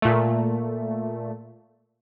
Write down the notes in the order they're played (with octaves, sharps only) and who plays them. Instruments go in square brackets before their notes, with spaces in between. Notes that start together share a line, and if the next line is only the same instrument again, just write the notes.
[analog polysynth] A#2 A3